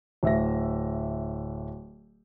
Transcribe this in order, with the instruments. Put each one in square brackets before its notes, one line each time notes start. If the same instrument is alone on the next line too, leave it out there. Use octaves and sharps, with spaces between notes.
[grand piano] D1 E5 A#6